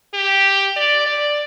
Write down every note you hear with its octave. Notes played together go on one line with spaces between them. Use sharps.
G4
D5
D5